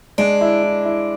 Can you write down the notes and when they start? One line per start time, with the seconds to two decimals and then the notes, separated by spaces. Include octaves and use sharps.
0.18 G#3 D4
0.41 E4
0.63 E4
0.85 E4